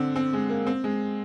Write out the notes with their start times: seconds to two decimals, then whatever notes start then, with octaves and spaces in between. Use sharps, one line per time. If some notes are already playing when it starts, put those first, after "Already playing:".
Already playing: D3 C4
0.16 C4
0.33 G#3
0.49 A#3
0.67 C4
0.84 G#3